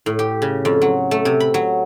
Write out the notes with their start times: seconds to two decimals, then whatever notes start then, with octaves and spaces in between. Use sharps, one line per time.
0.06 A2
0.19 G4
0.42 C#3
0.65 F2
0.82 F#3
1.11 A3
1.25 C3
1.40 B5
1.54 F#3